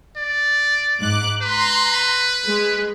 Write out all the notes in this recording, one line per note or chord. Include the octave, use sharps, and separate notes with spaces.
D5
G#2 D6 F#6
B4 A#5 C6
G#3